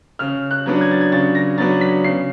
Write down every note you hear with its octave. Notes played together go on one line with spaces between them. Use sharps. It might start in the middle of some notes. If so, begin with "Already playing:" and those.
C#3 F6
F#6
F#3 B3 D4
G#6
A6
G#6
C#3 A6
A#6
F#3 B3 D4 A6
B6
C#3 C7